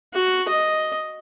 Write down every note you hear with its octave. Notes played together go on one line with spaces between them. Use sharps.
F#4
D#5